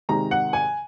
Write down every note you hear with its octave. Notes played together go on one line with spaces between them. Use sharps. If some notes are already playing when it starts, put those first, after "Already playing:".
C3 D#3 G#3 A#5
F#5
G#5